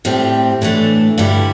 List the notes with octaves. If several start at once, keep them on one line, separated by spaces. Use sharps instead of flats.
A2 G3 C4 G4
A2 E3 A3 D4
G2 D3 G3 E4